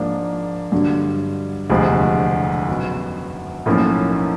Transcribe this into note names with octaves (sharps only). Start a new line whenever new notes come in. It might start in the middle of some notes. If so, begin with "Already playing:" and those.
Already playing: G#2 F3 A#3 D4
G2 D3 F#3
E1 D2 C3 F3 G#3
F#2 D#3 F#3 B3
B1 A2 F3 A#3 C#4